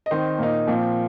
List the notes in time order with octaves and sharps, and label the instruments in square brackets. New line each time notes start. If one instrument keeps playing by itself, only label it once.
[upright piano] D#5
D#3 C4 D#4 C5
A#2 A#3 D#4
A#2 F3 C4 F4